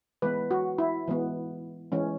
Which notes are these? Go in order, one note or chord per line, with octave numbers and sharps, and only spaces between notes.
E3 G#3 B3 B4
F#4
E4
E3 G#3 B3
E3 G#3 C#4